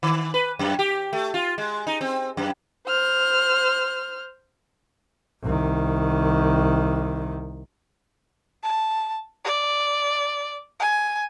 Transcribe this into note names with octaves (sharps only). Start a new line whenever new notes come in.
D#3
B4
F#2
G4
A3
F4
G#3
D#4
C4
F#2
C5 F6
C2 D#3
A5
D5
G#5